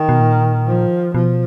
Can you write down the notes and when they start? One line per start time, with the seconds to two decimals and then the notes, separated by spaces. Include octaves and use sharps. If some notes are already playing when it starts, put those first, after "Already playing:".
Already playing: D#3
0.09 B2
0.20 A#2
0.67 F3
1.14 B2 F3